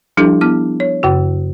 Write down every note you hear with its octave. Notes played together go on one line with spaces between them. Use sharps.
F3 G3 D4 E4 G4 A4
B3 E4 F6
C#5
F#2 C#3 F#4